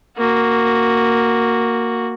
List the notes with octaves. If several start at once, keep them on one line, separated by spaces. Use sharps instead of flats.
A#3 F#4